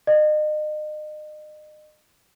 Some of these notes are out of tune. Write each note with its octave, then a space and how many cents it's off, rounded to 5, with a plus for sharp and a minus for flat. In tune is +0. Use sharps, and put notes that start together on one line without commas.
D#5 -35